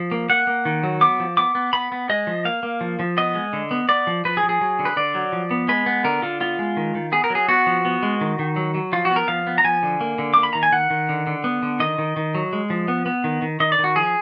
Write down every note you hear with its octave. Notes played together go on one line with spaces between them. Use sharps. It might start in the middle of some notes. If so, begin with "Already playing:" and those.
Already playing: F3
A#3
A#3 F#5
A#3
D#3
F#3
B3 D6
F3
B3 D6
B3
B3 B5
B3
G#3 D#5
F3
A#3 F5
A#3
F3
F3
B3 D#5
G#3
D3
B3
B3 D5
F3
F3 B4
G#4
F3
G#4
F#3
D3
B4
D3 D5
F#3
F3
B3
G#3 B4
B3
D3 A#4
D3 F4
B3 F4
G#3
D#3
D#3
B3 G#4
A#4
F#3
G#4
B3 F#4
F3
B3
G#3
D#3
D#3
F#3
F#3
F3 F4
F#4
B3
A#4
F3 F5
B3
A#5
F3 G#5
D3
A#3
D3
A#3 D6
B5
D#3 A#5
G#5
D#3 F#5
D#3
D3
D3
B3
D3
D#3 D#5
D#3
D#3
F#3
G#3
F3
B3
B3
D#3
D#3
D#3 D#5
D5
D#3
F#4
F3 G#4